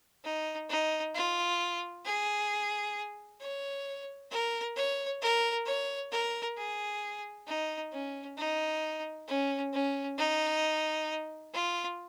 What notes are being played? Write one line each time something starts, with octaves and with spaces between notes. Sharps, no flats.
D#4
D#4
F4
G#4
C#5
A#4
C#5
A#4
C#5
A#4
G#4
D#4
C#4
D#4
C#4
C#4
D#4
F4